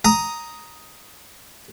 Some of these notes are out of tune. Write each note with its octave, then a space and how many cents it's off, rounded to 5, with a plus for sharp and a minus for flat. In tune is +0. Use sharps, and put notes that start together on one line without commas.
A#5 +0 D#6 +5